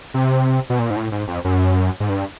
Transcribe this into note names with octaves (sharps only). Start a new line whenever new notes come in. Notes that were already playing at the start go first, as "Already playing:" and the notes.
C3
B2
A#2
G#2
A2
G#2
F2
F#2
G#2
G2